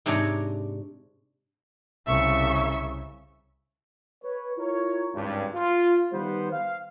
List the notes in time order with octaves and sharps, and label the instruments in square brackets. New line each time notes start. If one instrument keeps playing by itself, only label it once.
[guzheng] G#2 C3 D4 C#5 G#5 A#5
[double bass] C2 C#3 [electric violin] E5 C#6
[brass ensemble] B4 C#5
E4 F4 A#4 C#5
G#1 C#2 G2
F4
D#3 G3 B3 B4 C5
F5